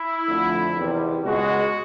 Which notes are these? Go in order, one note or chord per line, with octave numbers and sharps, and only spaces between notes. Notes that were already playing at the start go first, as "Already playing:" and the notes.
Already playing: E4
F2 D3 F3 A3
E2 C3 D#3 G3
C#2 B2 G#3 F#4